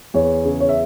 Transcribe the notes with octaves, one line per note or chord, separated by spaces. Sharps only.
E2 C#5
C#3
C#5
E5